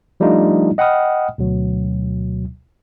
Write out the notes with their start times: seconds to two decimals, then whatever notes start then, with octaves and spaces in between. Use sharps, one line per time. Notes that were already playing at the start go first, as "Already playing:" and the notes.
0.20 F3 G3 A3 D4 D#4 F4
0.78 D#5 F#5 G5 B5 D#6 F6
1.38 D2 B2 F#3